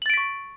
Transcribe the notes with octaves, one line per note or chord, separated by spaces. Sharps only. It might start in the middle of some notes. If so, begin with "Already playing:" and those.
C#6 A6 B6 D7 F#7